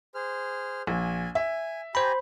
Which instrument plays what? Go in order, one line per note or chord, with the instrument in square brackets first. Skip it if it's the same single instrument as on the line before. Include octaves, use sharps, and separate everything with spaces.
[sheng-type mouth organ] G#4 C5 F6
[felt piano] A#1 [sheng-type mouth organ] G#5
[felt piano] E5 [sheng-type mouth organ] G#5
[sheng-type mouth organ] G4 G#5 A#5 [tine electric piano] C5 B5